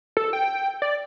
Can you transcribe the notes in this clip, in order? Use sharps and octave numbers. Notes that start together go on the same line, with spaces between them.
A4
G5
D5